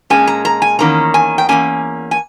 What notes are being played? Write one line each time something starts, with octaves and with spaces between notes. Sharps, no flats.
A#2 G#3 C#4 G#5
A#5
A#5
G#5
E2 D#3 A#3 C#4 A#5
G#5
G5
E2 D#3 A#3 C#4 G#5
G#5